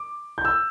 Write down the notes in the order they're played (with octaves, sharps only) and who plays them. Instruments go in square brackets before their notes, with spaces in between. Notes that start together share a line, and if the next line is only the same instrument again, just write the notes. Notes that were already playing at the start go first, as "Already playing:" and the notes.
Already playing: [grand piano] D6
G6
E6